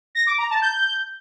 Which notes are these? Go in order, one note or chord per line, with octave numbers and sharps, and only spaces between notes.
A#6
D6
A#5
A5
G6